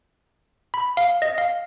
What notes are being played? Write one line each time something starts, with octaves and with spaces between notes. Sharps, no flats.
B5
F5
D#5
F5